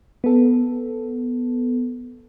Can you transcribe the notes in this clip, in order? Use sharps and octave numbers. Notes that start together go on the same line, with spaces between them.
B3 A4